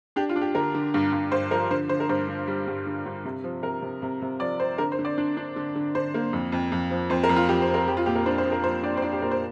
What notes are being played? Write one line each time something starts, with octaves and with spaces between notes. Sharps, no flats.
D4 G4
F4
D4
G4
D3 A#4
D3
G2
G2
G2 C5
F3 A#4
D3 C5
D3 C5
A#4
G2 C5
D3
G3
G2
D3
G2
C3
F3
C3 A#4
C3
C3
C3
F3 D5
C4 C5
D3 A#4
C5
D3
D5
D4
D4
D3
D3
D3 C5
A#3
F2
F2
F2
F3
F2 C5
A#4
F2
F4
F2 G4
C5
C4
A#4
F3 G4
F4
A#2 G4
A#4
D4 C5
C5
F3
A#4
F3 C5
D4 D5
C5
D4 D5
G4
A#2 A#4
C5